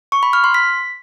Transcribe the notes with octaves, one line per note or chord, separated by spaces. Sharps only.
C#6
B5
F6
C6
B6